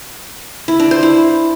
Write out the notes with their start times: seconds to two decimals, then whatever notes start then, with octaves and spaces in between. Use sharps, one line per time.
0.68 E4
0.80 D4
0.91 C5
1.03 E4